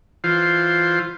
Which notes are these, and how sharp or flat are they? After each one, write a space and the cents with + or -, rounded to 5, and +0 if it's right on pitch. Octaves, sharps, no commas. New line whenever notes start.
E3 +5 F4 +0 C5 +0